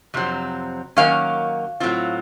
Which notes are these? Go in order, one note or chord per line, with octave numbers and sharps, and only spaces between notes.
F2 C3 F#3 C4
D#3 F#3 A#3 C#4 F5
A2 F#3 C4 F4